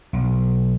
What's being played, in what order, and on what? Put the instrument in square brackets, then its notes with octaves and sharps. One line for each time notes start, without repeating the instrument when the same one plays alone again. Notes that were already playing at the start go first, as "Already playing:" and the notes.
[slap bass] B1